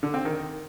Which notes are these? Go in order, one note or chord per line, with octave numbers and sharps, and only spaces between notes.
D3
C4
D#3